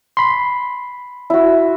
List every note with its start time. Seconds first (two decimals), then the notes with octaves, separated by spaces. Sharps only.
0.17 B5 C6
1.30 E4 F#4